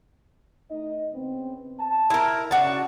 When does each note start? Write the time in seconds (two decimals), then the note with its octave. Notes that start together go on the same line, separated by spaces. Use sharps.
0.69 A3 D#4 D#5
1.13 C#3 B3 C4
1.79 A5
2.10 E4 A#4
2.51 C#3 D4 F#4 A5